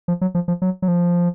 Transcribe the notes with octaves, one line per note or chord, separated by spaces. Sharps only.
F3
F#3
F3
F3
F#3
F#3
F3